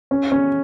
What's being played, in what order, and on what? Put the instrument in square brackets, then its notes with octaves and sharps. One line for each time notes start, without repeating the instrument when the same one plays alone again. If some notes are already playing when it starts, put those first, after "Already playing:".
[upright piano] C#4
C#4